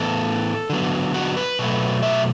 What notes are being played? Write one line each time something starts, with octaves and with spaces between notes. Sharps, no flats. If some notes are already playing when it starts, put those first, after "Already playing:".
Already playing: A2 E3 B3 A4
D3 F#3 B3
F#4
B4
B2 F#3 A3
E5